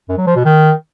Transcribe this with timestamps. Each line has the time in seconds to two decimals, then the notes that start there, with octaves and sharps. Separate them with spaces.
0.09 F#2
0.18 F#3
0.27 F3
0.36 B2
0.45 D#3